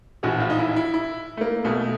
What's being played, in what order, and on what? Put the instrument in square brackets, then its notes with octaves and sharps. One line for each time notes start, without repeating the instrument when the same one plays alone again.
[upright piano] A#1 A2 E3 F#4
F4
D#4
E4
E4
E4
A3
A#3
B1 B2 A3